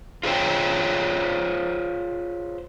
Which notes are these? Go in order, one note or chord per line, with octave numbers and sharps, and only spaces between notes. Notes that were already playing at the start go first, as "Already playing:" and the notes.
F4 G#4 C5 C#5 G5